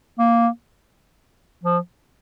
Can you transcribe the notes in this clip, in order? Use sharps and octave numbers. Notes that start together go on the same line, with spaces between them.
A#3
F3